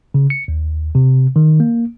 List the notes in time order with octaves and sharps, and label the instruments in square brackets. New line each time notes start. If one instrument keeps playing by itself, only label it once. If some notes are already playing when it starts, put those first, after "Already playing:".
[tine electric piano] C#3
C#7
D#2
C3
D#3
A#3